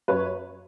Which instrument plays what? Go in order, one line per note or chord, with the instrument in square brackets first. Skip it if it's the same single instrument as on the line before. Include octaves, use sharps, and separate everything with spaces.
[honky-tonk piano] F#2 B4 C#5